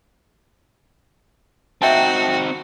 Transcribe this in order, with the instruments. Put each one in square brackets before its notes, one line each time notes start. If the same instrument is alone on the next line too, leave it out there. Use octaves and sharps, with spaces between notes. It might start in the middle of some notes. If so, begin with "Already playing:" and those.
[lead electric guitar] C4 D#4 [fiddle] F#4 [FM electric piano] E5 G5 A5